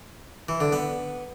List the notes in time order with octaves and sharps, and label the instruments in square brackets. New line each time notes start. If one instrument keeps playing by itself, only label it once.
[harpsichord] E3
D3
B3